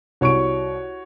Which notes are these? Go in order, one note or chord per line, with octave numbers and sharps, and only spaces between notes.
C2 F#4 C#5 C#6 D7